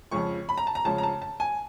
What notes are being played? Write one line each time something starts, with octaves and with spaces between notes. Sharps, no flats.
F2 C#3 F3 G#3 C#6
B5
A#5
A5
A#5
F2 C#3 F3 G#3 A5
A#5
A5
A5
G#5